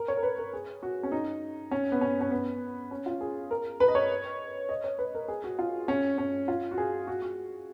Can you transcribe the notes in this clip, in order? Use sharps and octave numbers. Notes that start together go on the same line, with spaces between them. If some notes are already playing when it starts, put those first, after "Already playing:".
Already playing: A#4
C#5
A#4
B4
A#4
G#4
F#4
C#4
D#4
C#4
B3
C#4
C#4
B3
C#4
F4
G#4
A#4
B4
D#5
C#5
D#5
C#5
B4
A#4
G#4
F#4
F4
C#4
C#4
F4
F#4
G#4
F#4
F#4